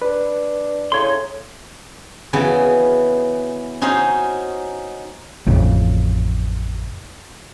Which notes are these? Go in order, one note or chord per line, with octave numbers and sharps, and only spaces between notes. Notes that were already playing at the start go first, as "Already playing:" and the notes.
D4 B4
A2 C#3 D#4 C#5 C6
C#3 E3 B3 F#4
C#4 D#4 F#4 C5
A1 F2 C#3